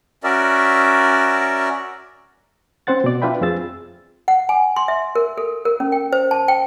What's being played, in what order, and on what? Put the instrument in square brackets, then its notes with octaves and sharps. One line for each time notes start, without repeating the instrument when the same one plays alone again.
[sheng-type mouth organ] C#4 F#4 A#4 D5 E5
[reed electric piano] C4 C#4 C5 F#5 A6
B2 D5
D4 F4 B4 E5 G5 B5
F2 C4 F4 G#4 E6 A6
[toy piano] F#5
G#5
C6
E5
A#4
A4
A#4
C#4
G5
C5
A5
G5